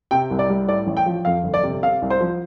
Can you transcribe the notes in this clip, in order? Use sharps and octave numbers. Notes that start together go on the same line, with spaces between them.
C3 G5
C2
D5
G3
A2 D5
A1
G5
F3
F2 F5
G1
D5
C3
C3 F5
C2
C5
F3